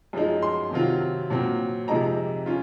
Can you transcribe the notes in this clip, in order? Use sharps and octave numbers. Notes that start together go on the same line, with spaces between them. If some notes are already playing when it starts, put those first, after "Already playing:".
F#2 F3 G#3 D#4
C6
C3 D#3 F#3 C4 F4
A#2 F#3 C4
F2 C3 F3 G#3 D#4 A#5
C#4 F4